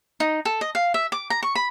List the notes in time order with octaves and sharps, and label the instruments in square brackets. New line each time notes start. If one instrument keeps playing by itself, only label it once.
[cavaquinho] D#4
A4
D#5
F5
E5
D6
A#5
C#6
B5